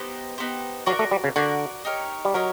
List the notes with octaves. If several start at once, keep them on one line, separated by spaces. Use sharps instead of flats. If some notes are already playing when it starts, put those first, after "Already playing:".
Already playing: B3 D#4 G4 C5
B3 D#4 G4 C5
F#3 F#4 A#4 D5
A3
G3
C#3
D3 F#4 A#4 D5
D#4 G4 A#4 C#5
G3
F#3 D#4 G4 A#4 C#5